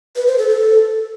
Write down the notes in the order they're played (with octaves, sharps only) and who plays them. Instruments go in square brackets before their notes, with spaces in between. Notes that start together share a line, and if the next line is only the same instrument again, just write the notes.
[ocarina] B4
C5
A4
A4